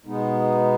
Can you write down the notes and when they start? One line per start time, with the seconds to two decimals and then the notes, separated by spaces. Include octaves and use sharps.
0.06 B2 G#3 B3 D#4